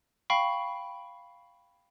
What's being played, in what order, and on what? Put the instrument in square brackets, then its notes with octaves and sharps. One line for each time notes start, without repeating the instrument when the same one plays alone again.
[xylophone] F5 G5 B5 C#6